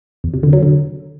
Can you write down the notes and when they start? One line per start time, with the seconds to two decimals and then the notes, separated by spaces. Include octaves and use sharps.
0.24 E2
0.34 C3
0.43 D3
0.53 F#3
0.63 D3